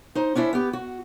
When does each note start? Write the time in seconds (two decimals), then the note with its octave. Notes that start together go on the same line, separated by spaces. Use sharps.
0.15 D#4 C5
0.35 C#4 D4 E4 C5
0.53 B3 G4
0.73 F#4